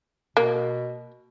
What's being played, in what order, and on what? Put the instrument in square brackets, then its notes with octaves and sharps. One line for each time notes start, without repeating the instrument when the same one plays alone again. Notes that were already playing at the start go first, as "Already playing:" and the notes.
[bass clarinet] B2 [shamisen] A#3